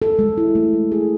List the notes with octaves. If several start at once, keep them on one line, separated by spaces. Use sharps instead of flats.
A4
G#3
E4
A3
A3
G#4